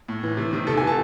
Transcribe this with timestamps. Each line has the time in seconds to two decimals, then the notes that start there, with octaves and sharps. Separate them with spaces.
0.08 A2
0.23 E3
0.37 C3
0.53 D#3
0.67 C3 A4
0.77 G#5
0.82 E3
0.87 A5